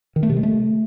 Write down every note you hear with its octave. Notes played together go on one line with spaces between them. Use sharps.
D#3
A3
C3
G#3
A3